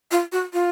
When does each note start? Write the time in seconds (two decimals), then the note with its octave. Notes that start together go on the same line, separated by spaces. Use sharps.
0.11 F4
0.32 F#4
0.53 F4